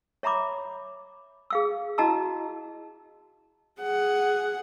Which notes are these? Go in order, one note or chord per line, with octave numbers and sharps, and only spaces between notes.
C#5 E5 A#5 B5 D6
G#4 F5 E6
E4 F#4 D#5 A5 A#5 E6
G#4 F#5